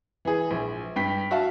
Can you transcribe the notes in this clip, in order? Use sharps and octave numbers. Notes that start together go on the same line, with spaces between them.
E3 G#4
A#1
G2 G5 B6
F#4 E5 F5 A5